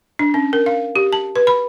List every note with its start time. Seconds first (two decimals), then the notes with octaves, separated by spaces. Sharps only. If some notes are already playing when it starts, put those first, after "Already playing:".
0.19 D4
0.34 C#4
0.53 A#4
0.66 F5
0.96 G4
1.13 A5
1.36 B4
1.47 B5